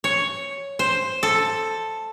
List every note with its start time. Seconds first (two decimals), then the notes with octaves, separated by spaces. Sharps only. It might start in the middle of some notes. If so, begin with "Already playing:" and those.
0.04 C#5
0.79 C5
1.23 A4